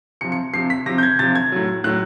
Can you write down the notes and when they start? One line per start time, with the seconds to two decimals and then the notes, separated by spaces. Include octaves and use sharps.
0.21 C3 F3 C#7
0.32 C#7
0.54 C3 F3 C7
0.70 B6
0.86 C3 F3 A#6
0.98 G6
1.03 G#6
1.19 C3 F3 A6
1.35 G#6
1.52 A2 F#3
1.84 A2 F#3 F#6